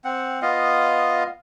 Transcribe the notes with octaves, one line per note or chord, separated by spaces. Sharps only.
C4 F#5
B3 F4 D#5 F5